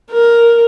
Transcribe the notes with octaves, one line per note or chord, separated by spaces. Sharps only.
A#4